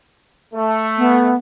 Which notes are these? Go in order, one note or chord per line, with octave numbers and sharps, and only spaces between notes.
A3
B3